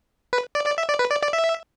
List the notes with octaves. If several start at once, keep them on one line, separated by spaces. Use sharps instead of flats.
B4
D5
D5
E5
D5
B4
D5
D5
E5